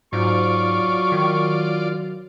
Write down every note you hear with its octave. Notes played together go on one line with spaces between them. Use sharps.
G#2 F#3 F4 D5 C#6
D#3